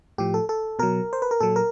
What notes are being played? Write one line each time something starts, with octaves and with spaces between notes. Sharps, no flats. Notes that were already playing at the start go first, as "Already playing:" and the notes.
A2 F3 G4
A4
A4
B2 F#3 A#4
C5
B4
A#4
A#2 F#3 A4
A#4